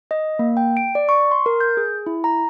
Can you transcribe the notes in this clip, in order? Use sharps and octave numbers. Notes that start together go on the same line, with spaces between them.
D#5
A#3
G5
D7
D5
C#6
C6
A#4
G6
G#4
E4
A#5